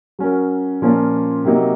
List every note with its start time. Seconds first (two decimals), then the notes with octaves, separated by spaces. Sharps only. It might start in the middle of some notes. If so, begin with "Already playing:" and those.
0.19 F#3 C#4 F#4 A#4
0.82 A#2 F3 A#3 C#4 F4
1.45 C3 F#3 A#3 D#4